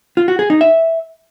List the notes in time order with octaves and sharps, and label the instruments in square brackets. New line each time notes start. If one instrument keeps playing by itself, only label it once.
[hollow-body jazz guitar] F4
F#4
G#4
D#4
E5